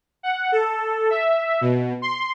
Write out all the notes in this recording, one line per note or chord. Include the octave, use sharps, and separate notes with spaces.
F#5
A4
E5
B2
C6